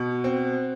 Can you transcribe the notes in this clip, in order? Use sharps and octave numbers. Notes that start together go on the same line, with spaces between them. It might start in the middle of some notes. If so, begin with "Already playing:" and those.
Already playing: B2 F#5
C4